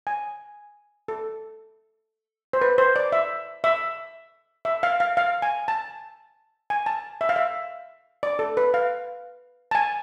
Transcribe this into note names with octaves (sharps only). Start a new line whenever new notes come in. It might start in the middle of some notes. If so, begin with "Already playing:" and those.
G#5
A4
C5
B4
C5
D5
E5
E5
E5
F5
F5
F5
G#5
A5
G#5
A5
E5
F5
E5
D5
A4
B4
F5
A5
G#5